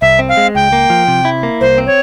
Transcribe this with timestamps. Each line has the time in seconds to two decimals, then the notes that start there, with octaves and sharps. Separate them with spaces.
0.01 C2 E5
0.19 C4
0.29 F5
0.37 G#3
0.55 C#2 G5
0.73 A#3
0.90 F3
1.08 C3
1.25 E4
1.43 A#3
1.61 C2 C5
1.78 C4
1.87 C#5